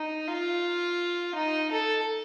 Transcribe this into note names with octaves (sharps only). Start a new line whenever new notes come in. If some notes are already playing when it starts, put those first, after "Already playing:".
Already playing: D#4
F4
D#4
A4